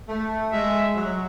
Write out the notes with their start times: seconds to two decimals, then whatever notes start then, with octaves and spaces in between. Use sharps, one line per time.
0.08 A3
0.52 G#3 E5
0.95 F#3